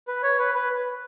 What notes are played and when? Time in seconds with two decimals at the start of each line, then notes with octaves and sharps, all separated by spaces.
0.08 B4
0.23 C#5
0.39 B4
0.55 B4